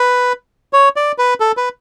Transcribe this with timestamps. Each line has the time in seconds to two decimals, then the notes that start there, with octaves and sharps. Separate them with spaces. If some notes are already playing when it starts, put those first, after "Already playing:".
Already playing: B4
0.73 C#5
0.96 D5
1.18 B4
1.40 A4
1.57 B4